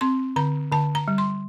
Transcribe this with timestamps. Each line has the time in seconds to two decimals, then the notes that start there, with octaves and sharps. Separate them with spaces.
0.01 C4 C6
0.36 D3 A#5
0.71 D3 A5
0.95 A#5
1.08 G3
1.18 C6